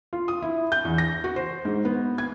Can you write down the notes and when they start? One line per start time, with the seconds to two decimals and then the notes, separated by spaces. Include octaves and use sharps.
0.13 F4
0.28 D#6
0.42 E4
0.72 G6
0.85 E2
0.98 A#6
1.24 F#4
1.36 C5
1.65 G#2
1.85 B3
2.18 G#6